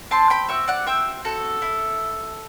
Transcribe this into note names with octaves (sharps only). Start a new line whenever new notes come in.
C4 A5 C6
G5 B5
F#4 E5 G5
D5 F#5
C4 E5 G5
F#4 A4
E4